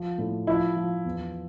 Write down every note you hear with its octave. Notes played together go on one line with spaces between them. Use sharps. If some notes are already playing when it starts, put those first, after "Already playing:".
Already playing: F3
A2
F3 E4
F3
E2